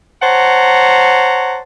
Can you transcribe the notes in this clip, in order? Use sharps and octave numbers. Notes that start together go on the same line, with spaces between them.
C5 C#5 F#5 A5 A#5